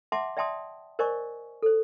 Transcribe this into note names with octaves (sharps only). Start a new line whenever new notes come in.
E5 F#5 A5 C6 D6
D5 E5 G5 A5 C6 D#6
A#4 C5 D5 D#5 G#5 C#6
A4 C5